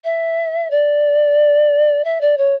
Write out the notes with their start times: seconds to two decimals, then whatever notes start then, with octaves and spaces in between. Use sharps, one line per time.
0.04 E5
0.70 D5
2.04 E5
2.21 D5
2.37 C#5